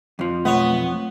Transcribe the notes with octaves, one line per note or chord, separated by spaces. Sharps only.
F2 F3
B1 A3 B3 C#5